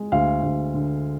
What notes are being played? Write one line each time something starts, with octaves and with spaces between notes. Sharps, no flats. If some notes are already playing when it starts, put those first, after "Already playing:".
Already playing: G#3
D2 F5
D2
D3